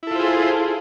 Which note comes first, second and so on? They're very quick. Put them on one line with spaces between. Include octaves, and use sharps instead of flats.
E4 A4 F4 C5 G#4